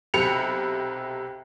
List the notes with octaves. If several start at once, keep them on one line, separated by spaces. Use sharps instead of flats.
B1 C3 G5 B5 C#7 F7